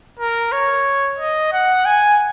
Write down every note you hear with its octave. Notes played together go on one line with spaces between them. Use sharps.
A#4
C#5
D#5
F#5
G#5